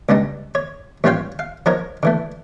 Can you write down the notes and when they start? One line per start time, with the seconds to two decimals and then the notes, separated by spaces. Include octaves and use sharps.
0.09 C#2 G2 G3 D#4
0.55 C#5
1.04 A1 G3 F4 C#5 F5 G5
1.39 F5
1.66 F3 D#4 A#4 C#5
2.03 D3 E3 A3